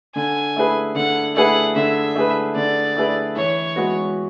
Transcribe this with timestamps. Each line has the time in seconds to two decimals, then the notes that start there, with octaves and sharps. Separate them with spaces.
0.15 D3 G#5
0.56 A3 E4 G#4 B4
0.95 D3 F#5
1.36 A3 E4 G#4 B4 F#5
1.75 D3 E5
2.16 A3 E4 G#4 B4
2.56 D3 D5
2.97 A3 E4 G#4 B4
3.36 E3 C#5
3.76 G#3 B3 F#4 B4